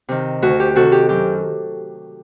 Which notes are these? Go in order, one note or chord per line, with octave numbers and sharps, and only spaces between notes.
C3 D#3
D2 F#4
G4
C3 D#3 F#4 A4
G4
F#2 G4